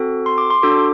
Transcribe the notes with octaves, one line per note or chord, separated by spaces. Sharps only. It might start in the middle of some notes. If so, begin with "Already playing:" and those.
Already playing: C4 F#4 A4
C6
D6
C6
D4 F#4 A4 D6